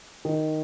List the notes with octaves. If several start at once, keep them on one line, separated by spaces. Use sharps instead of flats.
D#3